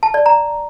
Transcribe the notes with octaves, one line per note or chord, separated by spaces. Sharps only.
A5
D5
A#5